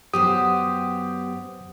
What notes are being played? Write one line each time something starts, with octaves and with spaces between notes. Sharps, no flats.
F#2 B3 G4 C5 D#6